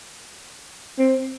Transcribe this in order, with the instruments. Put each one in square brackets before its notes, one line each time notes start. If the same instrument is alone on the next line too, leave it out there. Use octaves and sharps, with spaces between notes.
[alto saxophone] C4